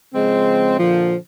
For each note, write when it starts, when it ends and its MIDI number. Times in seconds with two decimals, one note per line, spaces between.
0.14 0.78 49
0.14 0.78 53
0.14 0.78 56
0.14 0.78 60
0.78 1.16 46
0.78 1.16 50
0.78 1.16 53